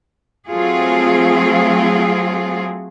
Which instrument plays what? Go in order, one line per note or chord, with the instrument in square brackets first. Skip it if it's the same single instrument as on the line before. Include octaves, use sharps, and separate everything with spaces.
[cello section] F#3 A3 C4 F4 F#4 G#4